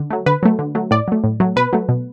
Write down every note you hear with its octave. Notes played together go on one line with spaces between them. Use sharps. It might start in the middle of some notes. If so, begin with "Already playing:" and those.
Already playing: D3
F#3 A3
D3 B4
F#3 A3
D3
F#3 A3
A2 D5
F#3 A3
A2
F#3 A3
B2 B4
F#3 A3
B2